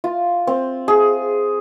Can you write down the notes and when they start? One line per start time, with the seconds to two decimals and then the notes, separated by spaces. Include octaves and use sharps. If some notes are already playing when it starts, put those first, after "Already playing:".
0.04 F4
0.47 C4
0.88 G#4